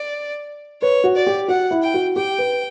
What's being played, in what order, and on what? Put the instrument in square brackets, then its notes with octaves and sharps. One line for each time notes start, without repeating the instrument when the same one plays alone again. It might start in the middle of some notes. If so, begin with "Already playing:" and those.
Already playing: [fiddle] D5
[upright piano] B4 [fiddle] C#5
[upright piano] F#4
[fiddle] D5
[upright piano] G4
[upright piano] F#4 [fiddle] F#5
[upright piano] E4
[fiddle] G5
[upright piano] F#4
[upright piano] G4 [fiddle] G5
[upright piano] B4